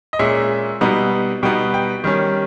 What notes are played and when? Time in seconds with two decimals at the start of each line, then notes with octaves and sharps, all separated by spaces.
0.13 D#5
0.19 A#2 G#3 C#4 E5
0.81 B2 G3 B3 D#4
1.43 B2 G3 B3 D#4 G5
1.74 G5
2.04 D#3 G3 C#4